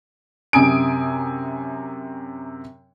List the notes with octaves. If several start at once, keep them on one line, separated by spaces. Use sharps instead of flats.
F#2 C3 G#5 D#6 D7